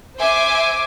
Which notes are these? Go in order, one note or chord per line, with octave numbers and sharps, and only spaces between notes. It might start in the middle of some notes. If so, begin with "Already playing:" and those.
C5 E5 G#5 D6